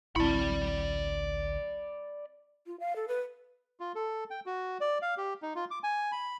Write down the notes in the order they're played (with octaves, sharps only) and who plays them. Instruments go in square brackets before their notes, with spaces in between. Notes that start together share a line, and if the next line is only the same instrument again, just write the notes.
[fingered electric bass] A1 D2 [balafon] C4 E4 [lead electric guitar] D5 B5
[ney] F4
F5
A4
B4
[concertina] F4
A4
G5
F#4
D5
F5
G4
D#4
F4
D6
G#5
B5